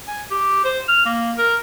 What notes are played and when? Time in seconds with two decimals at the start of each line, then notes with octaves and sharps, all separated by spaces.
0.07 G#5
0.31 G4
0.65 C5
0.88 F6
1.05 A#3
1.37 A#4